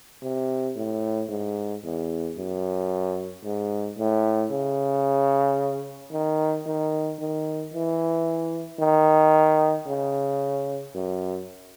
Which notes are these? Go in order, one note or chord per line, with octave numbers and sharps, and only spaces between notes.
C3
A2
G#2
E2
F#2
G#2
A2
C#3
D#3
D#3
D#3
E3
D#3
C#3
F#2